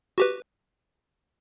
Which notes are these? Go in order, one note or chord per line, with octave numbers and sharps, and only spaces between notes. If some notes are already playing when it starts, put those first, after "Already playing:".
F#4 G4 B4